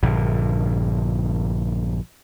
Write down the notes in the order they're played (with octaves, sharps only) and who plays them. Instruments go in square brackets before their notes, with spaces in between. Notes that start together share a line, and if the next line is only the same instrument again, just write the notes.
[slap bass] A#1 G2 D3